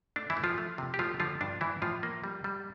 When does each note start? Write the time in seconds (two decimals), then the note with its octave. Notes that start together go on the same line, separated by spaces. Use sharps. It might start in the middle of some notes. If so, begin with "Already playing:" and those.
0.16 A3 D4
0.30 E3 E4
0.37 A3
0.44 F3 F4
0.58 A3
0.78 C3
0.94 G4
0.99 F3 A3 F4
1.20 D3 F3 F4
1.41 G2 D4
1.61 G2 E3 E4
1.82 A2 F3 F4
2.03 A#3
2.24 G3
2.44 G3